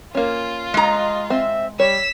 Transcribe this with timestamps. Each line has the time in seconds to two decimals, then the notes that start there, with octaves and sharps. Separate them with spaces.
0.15 A#3 C#4 F4
0.74 G#3 D#5 A#5
1.30 C4 E5
1.80 G3 C#5 E6 B6